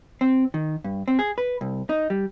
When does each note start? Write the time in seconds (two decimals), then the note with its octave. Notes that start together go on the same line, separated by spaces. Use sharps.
0.21 C4
0.54 D#3
0.84 G2
1.08 C4
1.19 G#4
1.38 B4
1.61 C2
1.89 D#4
2.10 G3